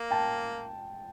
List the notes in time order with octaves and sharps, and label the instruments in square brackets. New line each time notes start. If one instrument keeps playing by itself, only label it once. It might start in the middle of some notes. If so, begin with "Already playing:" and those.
Already playing: [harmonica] A#3
[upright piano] G5 A5